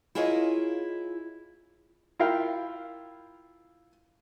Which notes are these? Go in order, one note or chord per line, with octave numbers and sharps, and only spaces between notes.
E4 F4 G#4 A#4 C#5 D#5
E4 F4 A#4 F5 G5